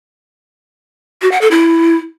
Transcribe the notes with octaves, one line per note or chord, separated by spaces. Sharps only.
F#4
F#5
A4
E4